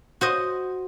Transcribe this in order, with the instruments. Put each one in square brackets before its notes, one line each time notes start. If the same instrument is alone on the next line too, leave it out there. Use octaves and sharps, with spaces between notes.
[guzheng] F#4 C5 D#5